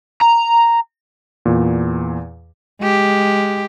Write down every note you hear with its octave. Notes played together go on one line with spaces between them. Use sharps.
A#5
E2 A#2
G#3 G4